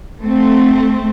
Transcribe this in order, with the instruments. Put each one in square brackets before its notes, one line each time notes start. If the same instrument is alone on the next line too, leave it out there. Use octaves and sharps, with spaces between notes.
[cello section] A3 C4